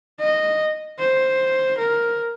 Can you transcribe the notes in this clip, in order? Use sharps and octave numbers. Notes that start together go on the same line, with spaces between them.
D#5
C5
A#4